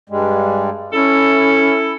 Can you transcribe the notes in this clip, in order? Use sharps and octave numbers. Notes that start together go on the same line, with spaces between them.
G2 G3 G#3
C#4 E4 A4